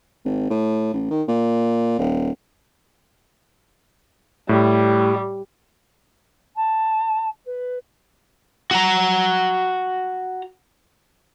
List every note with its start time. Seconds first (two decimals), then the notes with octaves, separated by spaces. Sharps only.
0.25 G#1
0.50 A2
0.93 A1
1.10 D#3
1.28 A#2
1.99 D#1
4.49 A2 G3
6.56 A5
7.45 B4
8.71 F#4 A#5